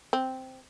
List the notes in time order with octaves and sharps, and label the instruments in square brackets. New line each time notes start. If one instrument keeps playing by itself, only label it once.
[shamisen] C4